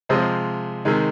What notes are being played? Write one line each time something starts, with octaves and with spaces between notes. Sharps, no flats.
C3 F3 G#3 C5 D#5
C3 D#3 G#3